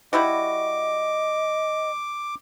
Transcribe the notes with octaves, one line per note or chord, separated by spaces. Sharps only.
G3 E4 F#4 D#5 D6